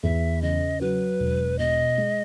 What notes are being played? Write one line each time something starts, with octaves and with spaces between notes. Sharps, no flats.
E2 E5
C#3 D#5
F#3 B4
E1
B2 D#5
G#3